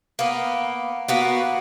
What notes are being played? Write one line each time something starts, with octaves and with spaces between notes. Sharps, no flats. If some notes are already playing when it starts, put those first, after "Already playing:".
A#3 B3
A#3 B3 F#4